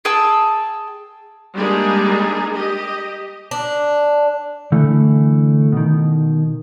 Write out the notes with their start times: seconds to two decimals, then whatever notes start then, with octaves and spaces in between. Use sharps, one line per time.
0.05 G#4 G5 A5 E6
1.55 G3 G#3 A#3 D4 D#4 G#4
2.52 G4 D#5
3.51 D4
4.72 D3 E3 A3
5.72 B2 D#3